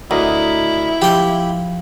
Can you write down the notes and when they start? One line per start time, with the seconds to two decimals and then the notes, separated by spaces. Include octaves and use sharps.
0.11 D2 E4 B4 D#5 A#5
1.02 F3 G4 G5